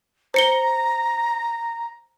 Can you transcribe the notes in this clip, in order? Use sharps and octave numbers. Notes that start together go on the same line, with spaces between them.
C5 A#5 C#7 G7